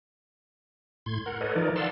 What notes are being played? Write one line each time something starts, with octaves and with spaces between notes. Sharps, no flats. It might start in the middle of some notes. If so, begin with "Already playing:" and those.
A2 C6 G#6
A#4 F#5
A4 B4 C#5 D#5
E3 F3 D#4 A#4 D5
D5 F5 F#5 A5 C6 E6